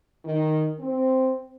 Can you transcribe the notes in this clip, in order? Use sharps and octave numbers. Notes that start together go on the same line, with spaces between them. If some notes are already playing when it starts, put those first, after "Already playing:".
D#3
C4